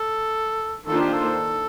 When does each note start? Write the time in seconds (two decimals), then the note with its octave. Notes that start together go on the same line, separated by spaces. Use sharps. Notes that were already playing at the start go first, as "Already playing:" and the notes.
Already playing: A4
0.87 D#3 A#3 D4 F4 A4 C5
1.00 G4
1.13 A4